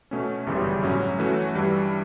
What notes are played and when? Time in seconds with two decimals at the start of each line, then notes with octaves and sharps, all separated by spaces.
0.11 B2 A3 C#4
0.46 G1 F#2 C#3 E3 G3
0.83 A2 F#3 C#4
1.19 E3 A3 C#4 F#4
1.55 G2 E3 G3